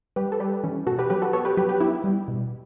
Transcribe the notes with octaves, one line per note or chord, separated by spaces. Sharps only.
G3 G4 B4
A4
G3 G4 B4
E3 C#4
B2 F#4 A4
G4 B4
F#3 G4 B4
F#4 A4
B3 A4 C#5
G4 B4
F#3 G4 B4
G4 B4
B3 E4 G4
G3
B2